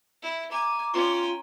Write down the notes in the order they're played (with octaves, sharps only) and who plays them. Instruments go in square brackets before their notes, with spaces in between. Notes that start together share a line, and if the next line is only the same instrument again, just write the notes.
[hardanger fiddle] E4
[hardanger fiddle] G#5 [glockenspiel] A#5 [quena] D6
[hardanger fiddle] C#4 G5 [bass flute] F4 [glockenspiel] C#6